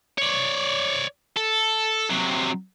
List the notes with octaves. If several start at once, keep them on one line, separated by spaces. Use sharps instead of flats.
C#5 D5
A4
C3 F#3